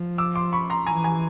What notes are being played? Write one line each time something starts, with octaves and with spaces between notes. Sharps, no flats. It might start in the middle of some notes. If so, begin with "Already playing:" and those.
Already playing: F3
D6 E6
C6 D6
B5 C#6
A#5 C6
E3 G#5 A#5
G#5 A#5